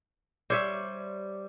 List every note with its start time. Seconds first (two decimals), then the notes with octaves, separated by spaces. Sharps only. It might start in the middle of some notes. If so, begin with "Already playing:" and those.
0.50 G3 C5 C#5 E5